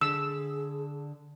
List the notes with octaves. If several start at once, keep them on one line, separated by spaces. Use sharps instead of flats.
D3 G#4 E6